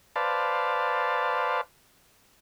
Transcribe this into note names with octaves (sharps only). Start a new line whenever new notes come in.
B4 C5 D5 F5 A5